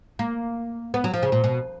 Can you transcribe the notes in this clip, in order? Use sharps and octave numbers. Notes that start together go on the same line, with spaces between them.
A#3
B3
F#3
F3
C#3
A#2
B2